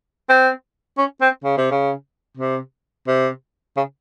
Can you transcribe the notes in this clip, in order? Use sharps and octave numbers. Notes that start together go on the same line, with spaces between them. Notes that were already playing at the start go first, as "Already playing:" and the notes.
C4
C#4
C4
C#3
C3
C#3
C3
C3
C#3